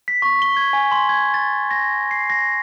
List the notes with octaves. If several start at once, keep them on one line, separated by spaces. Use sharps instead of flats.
B6
C#6
G7
G#6
G#5
C6
G#6
A6
A#6
C7
A#6